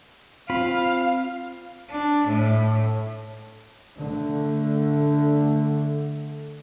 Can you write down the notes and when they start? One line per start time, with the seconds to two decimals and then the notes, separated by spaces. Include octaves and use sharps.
0.50 C4 F4 F5 B5
1.91 D4
2.27 A2
3.98 D3 A3